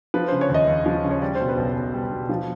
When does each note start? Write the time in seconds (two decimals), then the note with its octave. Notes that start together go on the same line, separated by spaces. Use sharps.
0.14 F3 B4
0.28 C#3 C5
0.41 C#5
0.50 D#2 D#5
0.68 D#2
0.86 F3
1.04 C#3
1.11 C#5
1.22 G3 D5
1.35 C5
1.40 B2
1.49 B4
1.58 B1
1.76 B1
1.94 G3
2.12 B2
2.29 F3